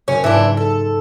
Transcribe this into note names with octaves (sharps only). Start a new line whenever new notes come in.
F#1 C#4
G#2 E3 D4
A4